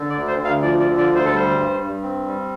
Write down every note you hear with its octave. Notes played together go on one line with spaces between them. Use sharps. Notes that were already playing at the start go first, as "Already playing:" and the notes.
Already playing: D3
D5
D2
C5
D2
F5
F3 D5
D5
D3
D5
D2
C5
A4
G3 C5
G2
G2
C4
G3